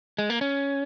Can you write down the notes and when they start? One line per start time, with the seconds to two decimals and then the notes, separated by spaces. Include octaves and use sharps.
0.18 G#3
0.30 A#3
0.41 C#4